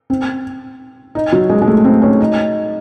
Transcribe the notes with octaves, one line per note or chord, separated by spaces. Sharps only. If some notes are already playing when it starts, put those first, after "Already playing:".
C4
D#4
F#3
G#3
G#3
A3
C4
C#4
D#4